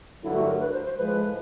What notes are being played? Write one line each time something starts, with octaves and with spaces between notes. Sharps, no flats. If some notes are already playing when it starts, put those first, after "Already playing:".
G2 D3 F#3 A3 E4
F#4
A#4
B4
C5
C5
A2 F3 G#3 B4